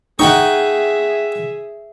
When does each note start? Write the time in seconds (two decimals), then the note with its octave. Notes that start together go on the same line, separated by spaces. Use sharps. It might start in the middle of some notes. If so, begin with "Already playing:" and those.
0.19 D#4 G#4 E5 F#5 G5 C#6